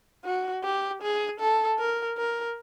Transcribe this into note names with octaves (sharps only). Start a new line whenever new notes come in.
F#4
G4
G#4
A4
A#4
A#4